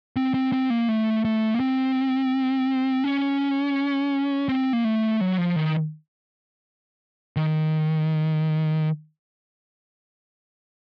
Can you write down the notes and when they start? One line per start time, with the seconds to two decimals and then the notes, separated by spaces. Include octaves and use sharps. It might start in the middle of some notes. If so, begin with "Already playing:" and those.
0.16 C4
0.34 C4
0.53 C4
0.70 A#3
0.89 A3
1.25 A3
1.54 A#3
1.60 C4
3.04 C#4
4.49 C4
4.73 A#3
4.85 A3
5.21 F#3
5.38 F3
5.56 D#3
7.36 D#3